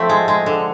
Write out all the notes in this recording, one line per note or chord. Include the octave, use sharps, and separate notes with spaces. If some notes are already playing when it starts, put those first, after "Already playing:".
Already playing: F3 A3 C4
G#3
G#3
D3